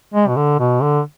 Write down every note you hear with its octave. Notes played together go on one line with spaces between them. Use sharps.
G#3
B2
D3
B2
D3